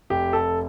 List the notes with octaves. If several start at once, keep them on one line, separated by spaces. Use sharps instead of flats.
F1 G4
A4